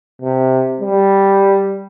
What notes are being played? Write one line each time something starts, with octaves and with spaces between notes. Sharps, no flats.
C3
G3